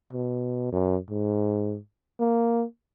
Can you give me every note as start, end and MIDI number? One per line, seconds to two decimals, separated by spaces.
0.13 0.71 47
0.72 0.96 42
1.10 1.77 44
2.19 2.64 58